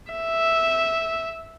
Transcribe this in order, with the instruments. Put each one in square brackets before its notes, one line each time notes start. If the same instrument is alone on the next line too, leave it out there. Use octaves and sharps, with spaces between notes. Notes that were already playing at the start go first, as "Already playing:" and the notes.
[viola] E5